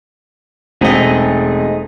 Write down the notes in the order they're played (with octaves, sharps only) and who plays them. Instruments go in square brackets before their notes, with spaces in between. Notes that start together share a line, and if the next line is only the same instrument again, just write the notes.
[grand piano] E1 [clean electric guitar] A3 D#4 G#4 [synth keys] C4 D#5